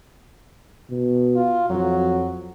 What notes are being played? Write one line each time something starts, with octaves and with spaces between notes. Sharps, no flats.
B2
F4
F2 F#3